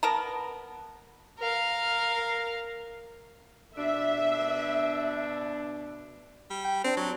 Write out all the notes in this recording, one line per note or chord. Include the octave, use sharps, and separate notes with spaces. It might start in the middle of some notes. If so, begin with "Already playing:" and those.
B3 A#4 A5 A#5
A#4 F5
B2 D4 E5
G3
G5
C4 D4
F#3